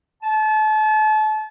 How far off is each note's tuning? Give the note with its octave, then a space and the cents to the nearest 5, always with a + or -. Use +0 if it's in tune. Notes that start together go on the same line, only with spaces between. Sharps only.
A5 -35